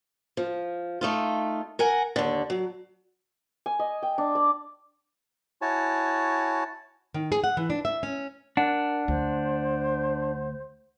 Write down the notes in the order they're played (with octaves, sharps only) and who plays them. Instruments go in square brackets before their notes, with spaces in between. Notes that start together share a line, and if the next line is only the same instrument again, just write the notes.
[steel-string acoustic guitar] F3
A3 D#4 F4
A#4 F#5 G#5
D#2 D3
F#3
[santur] G#5
D#5
G5
D4
D5
[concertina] E4 F#4 C#5 G#5 A5
[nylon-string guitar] D#3
G#4
F#5
E3
D4
E5
C#4
[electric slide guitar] D4 [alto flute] A#4 [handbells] F#5
[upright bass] D2 [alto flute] C5